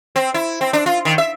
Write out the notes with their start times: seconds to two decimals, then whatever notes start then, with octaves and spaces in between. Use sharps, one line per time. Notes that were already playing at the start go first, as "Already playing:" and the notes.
0.16 C4
0.34 E4
0.61 C4
0.73 D4
0.86 F4
1.05 D#3
1.18 E5